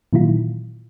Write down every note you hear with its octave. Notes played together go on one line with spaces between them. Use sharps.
A#2 D#3 E3 F#3 E4 F4